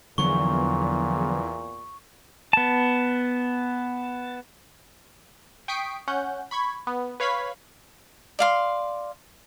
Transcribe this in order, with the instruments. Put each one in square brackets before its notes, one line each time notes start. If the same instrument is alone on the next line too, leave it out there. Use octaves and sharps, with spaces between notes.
[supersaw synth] E2 [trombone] A#2 [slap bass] D3 F3 F#3 [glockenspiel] C#6
[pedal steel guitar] B3 A5
[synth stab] G5 C#6 D#6 B6 C7 D7
C#4 F#5 G6
B5 C#6 G#6 B6
B3
B4 C#5 F5 B5 G#6 B6
[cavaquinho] D5 F5 C6